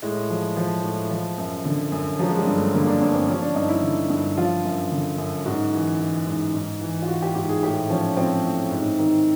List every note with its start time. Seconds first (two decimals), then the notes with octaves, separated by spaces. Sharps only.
0.02 A2 G#3
0.30 F3
0.57 F3
0.84 A2
1.10 F3
1.38 F#2
1.65 D3
1.92 F#2
2.19 F3 F#3
2.29 G#3
2.38 G3
2.47 G2
2.56 A3
2.73 D3 A#3
2.87 D4
3.01 G2 C#4
3.14 C4
3.28 F3 C#4
3.42 D4
3.55 G2 D#4
3.69 E4
3.83 D3
4.10 G2
4.37 F3 F4
4.64 F#2
4.92 D3
5.18 F#2
5.45 G#2 F#4
5.73 E3
6.00 E3
6.27 G#2
6.54 G#2
6.81 E3
7.02 F4
7.08 E3 F#4
7.22 G4
7.35 G#2 G4
7.49 G#4
7.62 A2 G4
7.89 F3 C#4
8.17 F3 C4
8.44 A2
8.71 G#2
8.99 D#3